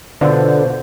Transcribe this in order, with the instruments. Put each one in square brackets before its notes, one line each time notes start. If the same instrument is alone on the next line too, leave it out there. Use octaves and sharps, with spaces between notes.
[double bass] B2 [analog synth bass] D3 [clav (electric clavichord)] B3 D4 F4 [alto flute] C5